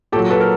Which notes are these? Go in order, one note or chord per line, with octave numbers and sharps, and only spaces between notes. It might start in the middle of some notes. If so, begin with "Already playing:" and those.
A#2 F#3 G4 A4
A4 B4
A#4